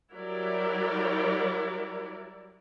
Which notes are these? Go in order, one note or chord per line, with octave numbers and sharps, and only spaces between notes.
F#3 G3 E4 A#4 D5